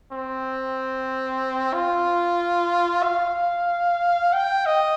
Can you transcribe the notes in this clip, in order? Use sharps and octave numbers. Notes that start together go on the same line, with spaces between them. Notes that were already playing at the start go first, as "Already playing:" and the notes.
C4
F4
F5
G5
D#5